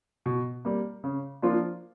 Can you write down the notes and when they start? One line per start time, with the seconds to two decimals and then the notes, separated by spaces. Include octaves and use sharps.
0.26 B2
0.65 G3 A#3
1.04 C#3
1.42 F3 A#3 D4 F4